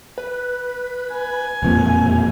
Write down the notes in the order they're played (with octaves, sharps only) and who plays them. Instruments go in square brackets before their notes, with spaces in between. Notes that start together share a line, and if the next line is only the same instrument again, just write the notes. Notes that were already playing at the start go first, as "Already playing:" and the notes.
[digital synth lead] B4
[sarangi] G#5
[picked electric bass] E1 F2 A#2